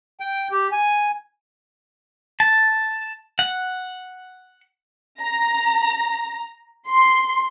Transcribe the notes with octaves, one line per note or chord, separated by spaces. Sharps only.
G5
G4
G#5
A5
F#5
A#5
C6